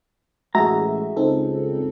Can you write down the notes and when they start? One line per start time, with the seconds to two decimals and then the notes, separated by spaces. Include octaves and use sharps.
0.55 A1 G#3 F#4 G#4 E5 A#5
1.17 C#2 C4 D#4 A4